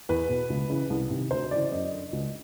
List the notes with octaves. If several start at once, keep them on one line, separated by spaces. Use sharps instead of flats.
E2 B4
B2
C#2
C#3 E3
C2
C3 D#3
D2 C5
C#3 E3 D5
F#2 D#5
D3
C#2